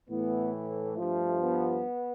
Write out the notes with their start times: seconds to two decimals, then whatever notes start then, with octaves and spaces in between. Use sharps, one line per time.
0.10 A2 E3 B3
0.54 A3
0.97 G2 F3
1.42 B3